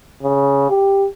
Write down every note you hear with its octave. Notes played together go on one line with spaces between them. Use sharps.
C#3
G4